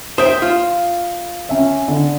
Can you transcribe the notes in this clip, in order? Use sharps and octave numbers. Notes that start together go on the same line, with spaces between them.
C5 E5 G5 D#6
F4
C#4 E5
D3